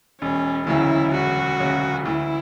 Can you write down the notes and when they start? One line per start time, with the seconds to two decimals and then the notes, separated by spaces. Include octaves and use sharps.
0.21 E1 C#4
0.67 D2 C#3 F#3 C#4 E4
1.13 E1 F#4
1.60 D2 C#3 F#3 C#4
2.05 D2 E4